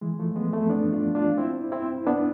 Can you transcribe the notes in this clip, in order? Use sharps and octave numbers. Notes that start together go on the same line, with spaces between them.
E3 G#3
F3 A3
G#3 B3
A3 C4
B3 D4
D4 F4
D4 F4
C4 E4
C4 E4
B3 D4